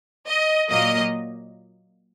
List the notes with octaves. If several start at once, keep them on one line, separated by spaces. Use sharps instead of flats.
D#5
A#2 F#3 A#3 D#5